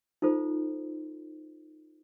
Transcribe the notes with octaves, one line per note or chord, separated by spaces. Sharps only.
D#4 F4 A4 C5